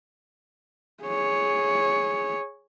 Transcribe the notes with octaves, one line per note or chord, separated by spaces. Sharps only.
G#4 C#5